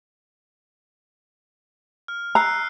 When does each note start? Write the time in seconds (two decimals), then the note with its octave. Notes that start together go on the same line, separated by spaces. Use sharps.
2.08 F6
2.35 A#5 E6 F#6 C7